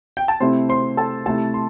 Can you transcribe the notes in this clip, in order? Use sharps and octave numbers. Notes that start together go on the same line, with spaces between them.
G5
A5
C3 A3 C4 E4 C5 C6
C5 C6
A4 A5
C3 A3 E4 A4 A5
C6